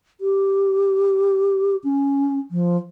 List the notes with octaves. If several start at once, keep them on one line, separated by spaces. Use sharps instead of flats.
G4
C#4
F3